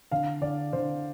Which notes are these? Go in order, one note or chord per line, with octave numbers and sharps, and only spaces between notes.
D3 F5
D3 D5
D3 C5